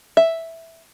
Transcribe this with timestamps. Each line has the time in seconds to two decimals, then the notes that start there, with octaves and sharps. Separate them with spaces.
0.17 E5